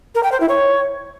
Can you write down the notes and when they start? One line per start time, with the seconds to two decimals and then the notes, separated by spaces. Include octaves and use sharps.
0.15 A#4
0.23 G5
0.32 C5
0.40 E4
0.49 C#5